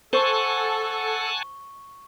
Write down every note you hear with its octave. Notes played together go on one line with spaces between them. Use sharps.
A4 C5 F#5 G#5 A5 C#6 G7